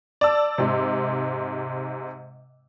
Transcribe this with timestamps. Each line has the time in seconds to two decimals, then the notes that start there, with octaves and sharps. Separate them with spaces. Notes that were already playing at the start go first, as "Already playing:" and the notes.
0.21 D5 A5 E6
0.58 G#2 C3